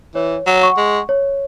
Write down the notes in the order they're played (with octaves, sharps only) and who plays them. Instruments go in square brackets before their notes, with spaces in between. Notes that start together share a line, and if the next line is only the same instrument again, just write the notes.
[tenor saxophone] E3 [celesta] C#5
[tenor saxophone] F#3
[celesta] F#5 C#6
[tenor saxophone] G#3
[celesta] C#5